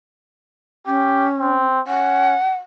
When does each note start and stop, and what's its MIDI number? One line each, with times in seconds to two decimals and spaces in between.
0.86 1.60 61
0.86 1.26 67
1.39 1.80 60
1.87 2.35 61
1.87 2.54 78